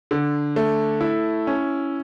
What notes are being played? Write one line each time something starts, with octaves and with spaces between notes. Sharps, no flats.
D3
A3
E4
C#4